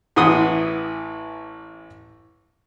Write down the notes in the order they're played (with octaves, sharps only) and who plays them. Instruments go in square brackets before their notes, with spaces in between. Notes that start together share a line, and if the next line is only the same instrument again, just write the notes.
[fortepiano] A1 E3 B3 F#5 C6 D#6